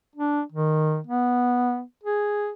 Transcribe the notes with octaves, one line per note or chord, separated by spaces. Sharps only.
D4
D#3
B3
G#4